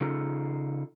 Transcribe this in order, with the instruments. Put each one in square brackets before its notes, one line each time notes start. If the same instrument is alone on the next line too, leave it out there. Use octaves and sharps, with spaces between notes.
[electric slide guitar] C#3 D#4 F4 A4